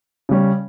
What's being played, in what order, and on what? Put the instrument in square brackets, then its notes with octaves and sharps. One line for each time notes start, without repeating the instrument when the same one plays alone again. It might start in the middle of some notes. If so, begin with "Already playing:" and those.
[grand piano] C#3 G3 C#4